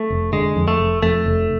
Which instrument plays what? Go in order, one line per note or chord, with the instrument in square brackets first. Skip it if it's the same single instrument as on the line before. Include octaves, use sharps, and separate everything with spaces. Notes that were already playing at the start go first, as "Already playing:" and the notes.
Already playing: [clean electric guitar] A3
[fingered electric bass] F1
[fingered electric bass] D3 [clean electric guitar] G#3
[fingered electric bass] F2
[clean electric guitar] A3
[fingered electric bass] F1
[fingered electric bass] F2 [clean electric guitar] A3
[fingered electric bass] F1